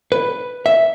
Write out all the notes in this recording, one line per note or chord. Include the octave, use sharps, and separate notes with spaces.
B4
E5